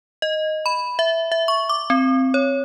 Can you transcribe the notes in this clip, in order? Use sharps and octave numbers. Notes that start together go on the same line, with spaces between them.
D#5
B5
E5
E5
C#6
D6
C4
C#5